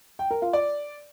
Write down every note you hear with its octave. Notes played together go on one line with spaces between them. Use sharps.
G5
A#4
F4
D5